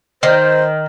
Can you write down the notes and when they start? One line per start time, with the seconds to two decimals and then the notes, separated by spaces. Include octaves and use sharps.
0.23 D#3 C5